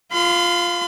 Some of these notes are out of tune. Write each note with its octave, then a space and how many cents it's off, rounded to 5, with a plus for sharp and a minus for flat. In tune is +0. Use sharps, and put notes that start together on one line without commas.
F4 +0 B5 +45